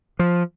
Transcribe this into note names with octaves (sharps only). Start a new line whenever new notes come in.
F3